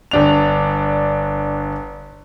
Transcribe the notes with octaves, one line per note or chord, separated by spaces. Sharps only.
G1 D4 F7